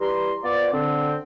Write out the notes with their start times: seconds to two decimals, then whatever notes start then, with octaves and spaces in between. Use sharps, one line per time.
0.01 E3 G3 E4 G4 A#5 C6
0.44 B3 F4 C5 D5
0.73 D3 C4